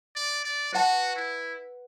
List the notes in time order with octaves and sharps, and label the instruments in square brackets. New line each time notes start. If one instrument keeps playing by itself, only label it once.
[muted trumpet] D5
D5
[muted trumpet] F#4 [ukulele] B4 F#5 A5
[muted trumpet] E4